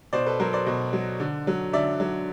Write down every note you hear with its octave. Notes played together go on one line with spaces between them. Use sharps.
B2 C5 D5
A4 B4
F#3 A#4 C5
C5 D5
B2
F#3
D3
F#3
D3 D5 E5
F#3